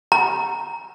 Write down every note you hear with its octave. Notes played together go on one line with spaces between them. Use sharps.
A#5